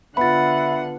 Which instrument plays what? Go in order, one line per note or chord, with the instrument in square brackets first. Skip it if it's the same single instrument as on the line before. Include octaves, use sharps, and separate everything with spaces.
[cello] D3 F#5 [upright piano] B3 F4 [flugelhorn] E5 [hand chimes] B5 A6